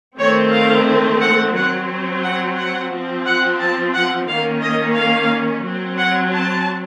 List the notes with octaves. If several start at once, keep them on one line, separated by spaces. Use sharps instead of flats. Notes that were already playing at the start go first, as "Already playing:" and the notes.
D#3 A3 C4 C#5
F5
F#5
F#3 C4 F#5
F#5
F#5
F3 C4
F#5
A5
F#5
D#3 A#3 C#4 F5
D#5
F5
F#3 C4
F#5
A5